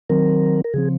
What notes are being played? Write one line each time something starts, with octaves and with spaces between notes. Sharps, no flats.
D#3 F#3 C4 A#4
A#4
C#3 F3 C4 G#4